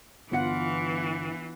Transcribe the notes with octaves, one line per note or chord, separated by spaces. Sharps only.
G1 E3 B3 F4 F#5 C#7